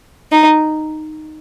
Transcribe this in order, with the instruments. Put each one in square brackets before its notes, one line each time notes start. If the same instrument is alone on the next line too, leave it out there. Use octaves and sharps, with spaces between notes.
[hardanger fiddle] D#4